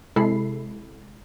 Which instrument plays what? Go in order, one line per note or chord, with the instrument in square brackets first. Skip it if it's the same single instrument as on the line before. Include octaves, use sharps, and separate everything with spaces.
[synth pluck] C3 G#3 E4 A4 B5 C7